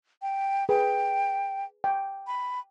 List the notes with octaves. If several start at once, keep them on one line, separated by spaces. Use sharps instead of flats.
G5
G#4 B4 G5
G5
B5